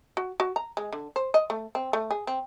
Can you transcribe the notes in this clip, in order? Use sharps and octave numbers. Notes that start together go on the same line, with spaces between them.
F#4
F#4
A#5
G#3
D3
C5
D#5
A3
C4
A3
G#4
C4